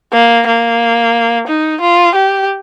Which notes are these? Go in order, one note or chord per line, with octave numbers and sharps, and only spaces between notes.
A#3
A#3
D#4
F4
G4